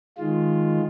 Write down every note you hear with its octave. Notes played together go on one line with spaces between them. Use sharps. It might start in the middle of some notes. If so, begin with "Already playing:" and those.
D#3 G#3 F4